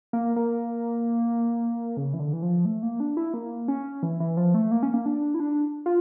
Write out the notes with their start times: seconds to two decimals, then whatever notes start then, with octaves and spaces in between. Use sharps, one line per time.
0.13 A#3
0.36 A#3
1.97 C#3
2.14 E3
2.20 D3
2.33 E3
2.42 F3
2.65 A3
2.83 A#3
3.00 D4
3.17 E4
3.34 A#3
3.68 C#4
4.03 E3
4.20 E3
4.37 F3
4.54 A3
4.71 A#3
4.83 C#4
4.94 A#3
5.06 D4
5.34 E4
5.40 D4
5.86 F4